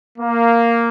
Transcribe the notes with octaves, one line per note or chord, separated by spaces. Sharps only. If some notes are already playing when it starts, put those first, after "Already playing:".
A#3